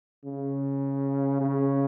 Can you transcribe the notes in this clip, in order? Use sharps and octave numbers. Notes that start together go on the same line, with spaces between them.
C#3
C#3